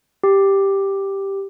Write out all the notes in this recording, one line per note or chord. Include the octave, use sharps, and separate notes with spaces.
G4